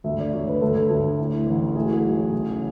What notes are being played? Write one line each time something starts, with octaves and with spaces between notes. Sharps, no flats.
D2 E5
D5
D2 C#5
B4
D2 A4
D2
A2
A1
A2 G#4
F#4
G#4
B1
C#3